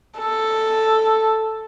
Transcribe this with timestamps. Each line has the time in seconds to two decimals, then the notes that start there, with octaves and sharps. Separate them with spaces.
0.19 A4